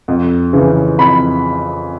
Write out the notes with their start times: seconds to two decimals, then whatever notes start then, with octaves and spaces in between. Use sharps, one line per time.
0.08 F2
0.53 C#3 E3
0.98 F2 B5